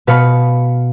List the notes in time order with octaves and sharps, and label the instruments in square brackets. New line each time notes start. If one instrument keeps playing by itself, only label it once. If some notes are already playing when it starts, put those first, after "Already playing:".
[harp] B2 B4 F5 B5 C#7